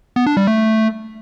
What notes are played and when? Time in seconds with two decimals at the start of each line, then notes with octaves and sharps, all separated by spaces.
0.16 B3
0.26 D4
0.37 G3
0.47 A3